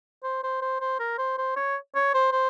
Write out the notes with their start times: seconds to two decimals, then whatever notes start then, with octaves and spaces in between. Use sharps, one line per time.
0.23 C5
0.44 C5
0.62 C5
0.81 C5
0.99 A#4
1.18 C5
1.38 C5
1.56 C#5
1.95 C#5
2.14 C5
2.32 C5